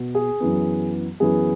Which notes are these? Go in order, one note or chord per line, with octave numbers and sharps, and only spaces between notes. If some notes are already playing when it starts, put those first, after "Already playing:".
Already playing: B2
G#4
F#2 E3 B3
F#2 E3 B3 G#4